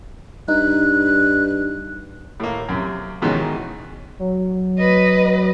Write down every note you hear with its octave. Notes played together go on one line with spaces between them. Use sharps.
G2 D#4 F#6
A2 A#3
F#2 C3
G#2 B2 D#3 E3 G#3 C#4
F#3
B4 D#5